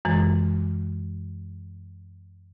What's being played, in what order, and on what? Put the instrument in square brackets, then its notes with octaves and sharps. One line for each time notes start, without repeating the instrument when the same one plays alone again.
[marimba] F#2 E3 G#3